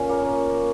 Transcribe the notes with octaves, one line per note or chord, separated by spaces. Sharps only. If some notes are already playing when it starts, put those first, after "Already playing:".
Already playing: A#2 C#4 C#5
A#3